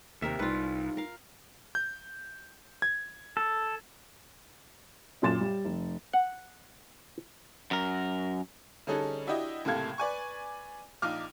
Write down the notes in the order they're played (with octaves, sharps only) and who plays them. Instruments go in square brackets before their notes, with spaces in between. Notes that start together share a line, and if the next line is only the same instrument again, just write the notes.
[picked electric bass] D#2 [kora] C3 A#4 E5
[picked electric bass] C2 [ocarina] D#4 [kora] F4 B4
[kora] A#4 F5
[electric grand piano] G6
G#6
[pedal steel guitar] A4
[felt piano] F#2 A#2 C6 A6 E7
G3
F1
[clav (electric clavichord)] F#5
[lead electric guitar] F#2 A#4
[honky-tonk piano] D3 G3 C#4 D#4 G#4 A4
D4 E4 F#4 G4 D#5 E5
F#1 A2 C3 A4 F5 G#6
B4 D5 G#5 C#6
A#1 D#4 F4 D6 F6